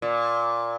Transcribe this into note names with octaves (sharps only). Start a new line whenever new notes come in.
A#2